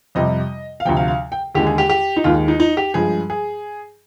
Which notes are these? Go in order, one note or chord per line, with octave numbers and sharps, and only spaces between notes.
F2 C3 G3 D#5
F5
D2 C3 F3 G5
F5
F5
G5
D#2 D3 G#3 G4
G#4
G4
G4
D#4
D#2 D#3 G#3 F4
D#4
D#4
G4
G2 F3 G#3 G#4
G#4